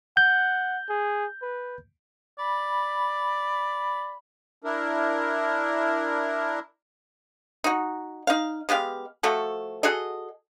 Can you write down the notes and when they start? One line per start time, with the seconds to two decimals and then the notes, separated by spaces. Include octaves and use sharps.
0.17 F#5 G6
0.90 G#4
1.42 B4
2.39 D5 B5
4.64 D4 E4 A#4
7.64 D#4 F#4
8.27 D#4 F5
8.69 G#3 B3 G4 F5
9.23 F3 A3 F#4 A4
9.83 F#4 G#4 A4 D#5